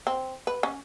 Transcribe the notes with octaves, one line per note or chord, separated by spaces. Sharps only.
C4
B4
C#4